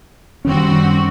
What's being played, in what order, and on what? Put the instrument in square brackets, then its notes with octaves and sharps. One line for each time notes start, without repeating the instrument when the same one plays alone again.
[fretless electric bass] F#2 D#3 C#4 [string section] G3 C4 F#4